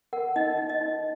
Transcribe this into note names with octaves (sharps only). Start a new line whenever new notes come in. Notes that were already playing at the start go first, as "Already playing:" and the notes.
A#4 F#5
D#4 D#5
D#4
D#5
D#4